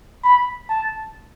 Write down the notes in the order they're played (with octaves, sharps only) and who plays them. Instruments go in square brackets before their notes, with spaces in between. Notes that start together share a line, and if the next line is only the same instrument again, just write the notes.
[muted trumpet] B5
A5